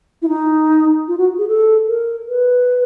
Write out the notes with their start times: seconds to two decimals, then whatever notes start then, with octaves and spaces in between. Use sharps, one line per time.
0.22 E4
0.28 D#4
1.08 F4
1.18 F#4
1.38 G#4
1.48 A4
1.88 A#4
2.28 B4